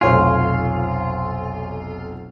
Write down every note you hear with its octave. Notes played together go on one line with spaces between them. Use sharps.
F1 B1 F4 C5 C#5 F#5 G#5